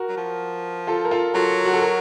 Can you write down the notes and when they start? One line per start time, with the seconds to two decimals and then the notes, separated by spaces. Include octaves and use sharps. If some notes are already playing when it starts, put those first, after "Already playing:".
Already playing: F#4 A#4
0.09 F#3
0.17 F3
0.87 F4 A4
1.05 A#4
1.11 F4 A4
1.34 F#3 F4 A4
1.65 F#4
1.73 A4
1.81 F#4 A#4